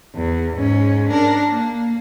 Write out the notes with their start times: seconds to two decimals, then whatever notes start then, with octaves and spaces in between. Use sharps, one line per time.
0.15 E2
0.57 G#2 C#4
1.09 D4 A#4
1.51 A#3